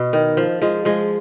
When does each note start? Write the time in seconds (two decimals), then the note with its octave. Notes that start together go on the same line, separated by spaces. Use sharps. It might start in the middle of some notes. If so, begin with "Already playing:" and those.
Already playing: B2
0.13 D#3
0.37 F3
0.62 F3 G#3
0.85 F3 G#3